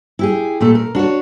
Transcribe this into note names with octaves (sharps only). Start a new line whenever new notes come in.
E4 G4 G#4
A#2 A3 A4
A#4
D4 F#4 B4 C#5